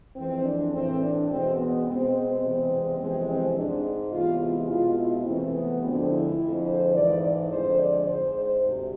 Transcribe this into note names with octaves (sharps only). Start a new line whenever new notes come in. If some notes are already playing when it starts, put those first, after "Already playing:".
F2 E3 G#3 C4
D4
A2 E3 A3 C4
D4
E2 B2 G#3 C4
B3
B2 G#3 C4
C4
E2 C3 G#3
F2 C3 E3 G#3 C4
C4
G#2 G#3 D4
E2 C3 G#3 F4
E4
B2 G#3 F4
E4
E2 C3 E3 A3 C4
B3
D2 D3 F3 G#3 C4
E4
F2 D3 G#3
C5
G#2 E3 A3 D5
D5
F2 D3 G#3 C5
D5
G#2 G#3 C5
C5
D2 C3